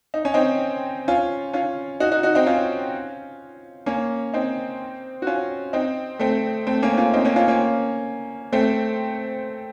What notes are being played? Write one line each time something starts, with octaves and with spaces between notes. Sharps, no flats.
D#4
C#4
C4 D#4
C#4 F4
C#4 F4
D#4 F#4
D#4 F#4
D#4 F#4
C4 D#4
C#4 F4
A#3 C#4
C4 D#4
F#4
C#4 F4
C4 D#4
A3 C4
A3 C4
A#3 C#4
C#4 F4
C4 D#4
A#3 C#4
C#4 F4
A#3 C#4
A3 C4